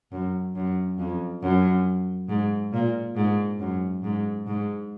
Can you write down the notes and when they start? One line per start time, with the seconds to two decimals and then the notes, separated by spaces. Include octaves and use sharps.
0.12 F#2
0.55 F#2
0.98 F2
1.42 F#2
2.29 G#2
2.73 A#2
3.16 G#2
3.60 F#2
4.03 G#2
4.47 G#2